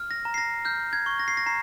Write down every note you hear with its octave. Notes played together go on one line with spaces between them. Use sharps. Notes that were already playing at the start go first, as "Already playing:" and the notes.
Already playing: F6
A#6
A#5
C7
A#6
F6 G6
G#6
C#6
A#6
C7
A#6
A#5 C7